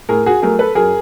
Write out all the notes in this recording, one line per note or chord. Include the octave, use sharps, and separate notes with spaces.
A2 G#4 A#4
F#4 G#4
F#3 A3 G#4 A#4
A4 B4
F#2 G#4 A#4